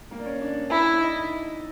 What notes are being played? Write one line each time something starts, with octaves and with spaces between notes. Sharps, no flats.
A#3 A#4
D5
C#4 C#5
D4 D5
E4
D#4 D#5